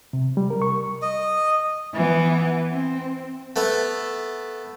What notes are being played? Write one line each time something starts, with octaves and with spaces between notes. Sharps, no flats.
C3
G3
A#4
C#6
D#5
E3 B3
C4
A3 B3 A4